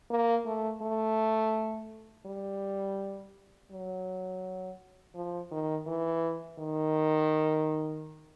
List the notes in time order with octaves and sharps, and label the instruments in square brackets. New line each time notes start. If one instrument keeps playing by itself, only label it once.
[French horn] A#3
A3
A3
G3
F#3
F3
D#3
E3
D#3